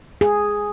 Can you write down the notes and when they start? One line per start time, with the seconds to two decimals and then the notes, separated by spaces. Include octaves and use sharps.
0.21 G#4